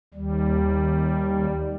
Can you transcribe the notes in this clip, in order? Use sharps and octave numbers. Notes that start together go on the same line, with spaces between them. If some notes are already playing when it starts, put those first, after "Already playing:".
D#2 G3